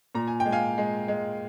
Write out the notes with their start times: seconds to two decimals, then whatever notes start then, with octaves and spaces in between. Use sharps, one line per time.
0.15 A#2 A#5
0.28 G#5
0.40 G5
0.46 G#3
0.52 F5 G#5
0.78 G#3
1.08 G#3